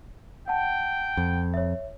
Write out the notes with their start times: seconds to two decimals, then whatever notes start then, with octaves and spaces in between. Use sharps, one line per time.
0.48 F#5 G5 A5
1.17 F2
1.54 C#5 E5